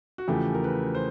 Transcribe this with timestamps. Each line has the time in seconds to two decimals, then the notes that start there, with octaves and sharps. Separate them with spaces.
0.18 F#4
0.28 E2 C#3 F3 A3 G4
0.54 A#4
0.64 B4
0.95 C5